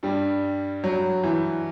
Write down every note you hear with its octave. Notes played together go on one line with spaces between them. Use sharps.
G2 G3
F#3
E3